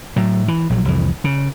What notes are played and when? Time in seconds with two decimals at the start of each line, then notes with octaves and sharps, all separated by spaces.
0.16 A2 F#3
0.48 E3
0.70 A#1 F#3
0.85 C2 F2 E3
1.24 C#3